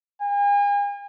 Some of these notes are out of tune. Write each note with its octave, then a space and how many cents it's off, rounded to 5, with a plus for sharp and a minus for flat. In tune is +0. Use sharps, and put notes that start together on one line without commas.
G#5 -40